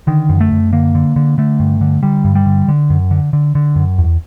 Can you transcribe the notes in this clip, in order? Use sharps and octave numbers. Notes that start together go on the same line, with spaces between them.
D3 D#3
F#2
A3
F#2
D3 A#3
D3
D3
D3 A3
G2
D3
D3 G3
G2
G3
D3
D3
F#2
D3
D3
D3
F#2
E2